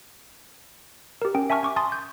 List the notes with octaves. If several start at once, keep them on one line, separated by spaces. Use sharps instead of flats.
G4 A#4
C#4 G5
E5 G#5 A5 C#6 F6
G#5 C#6 D6
G#5 A5 C6 D#6 A6
G6